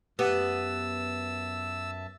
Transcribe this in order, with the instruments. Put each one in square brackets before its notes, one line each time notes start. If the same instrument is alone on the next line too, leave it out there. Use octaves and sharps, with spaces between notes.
[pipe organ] F#2 E5 A5 [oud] B3 [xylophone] G4 F#5 [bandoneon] E6